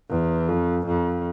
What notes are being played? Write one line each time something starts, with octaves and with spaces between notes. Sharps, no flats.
E2
F2
F2